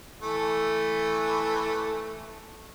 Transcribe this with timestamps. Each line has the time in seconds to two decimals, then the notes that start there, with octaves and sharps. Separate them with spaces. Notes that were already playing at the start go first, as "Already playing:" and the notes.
0.22 E3 A3